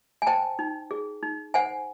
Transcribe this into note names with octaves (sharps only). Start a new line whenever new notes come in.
G#5
C5 G5 A5
D#4
G#4
D#4
C5 F#5 G#5